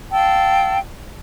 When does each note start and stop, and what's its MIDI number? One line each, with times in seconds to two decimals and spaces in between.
0.11 0.78 77
0.11 0.78 79
0.11 0.78 81
0.11 0.78 88